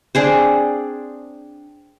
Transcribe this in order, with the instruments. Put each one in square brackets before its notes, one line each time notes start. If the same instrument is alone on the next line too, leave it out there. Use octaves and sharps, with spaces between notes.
[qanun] C4 D4 G#4 C5